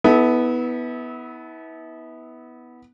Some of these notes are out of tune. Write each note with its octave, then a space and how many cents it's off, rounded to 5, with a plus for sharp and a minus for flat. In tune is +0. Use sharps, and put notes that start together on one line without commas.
B3 +0 E4 -35 A4 -30